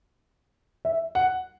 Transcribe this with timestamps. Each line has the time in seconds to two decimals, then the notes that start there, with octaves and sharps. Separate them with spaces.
0.85 E5
1.15 F#5